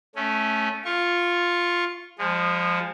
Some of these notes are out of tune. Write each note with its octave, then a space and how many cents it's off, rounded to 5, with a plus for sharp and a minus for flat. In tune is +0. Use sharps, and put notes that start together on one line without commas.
A3 -15 C#4 +0
F4 +0 C#6 -25
F3 +10 G#3 -30